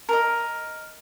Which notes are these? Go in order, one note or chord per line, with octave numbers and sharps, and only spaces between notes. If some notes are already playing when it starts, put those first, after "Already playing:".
A#4 D#5